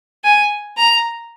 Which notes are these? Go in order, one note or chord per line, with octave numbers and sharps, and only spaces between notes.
G#5
A#5